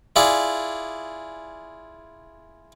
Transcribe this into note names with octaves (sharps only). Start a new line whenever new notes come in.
E4 F4 G#4 D5